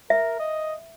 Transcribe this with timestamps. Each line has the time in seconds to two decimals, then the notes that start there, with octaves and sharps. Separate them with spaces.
0.10 A#4 E5
0.40 D#5